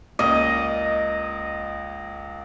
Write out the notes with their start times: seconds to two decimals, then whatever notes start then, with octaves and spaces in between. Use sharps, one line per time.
0.19 C#2 A#3 D#5